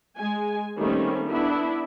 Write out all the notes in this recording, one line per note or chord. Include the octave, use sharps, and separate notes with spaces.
G#3 G#5
D#3 G3 A3 A#3 C4 C#4
B3 D4 E4